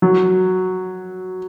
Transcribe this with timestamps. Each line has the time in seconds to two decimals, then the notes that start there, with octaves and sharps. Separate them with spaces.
0.02 F#3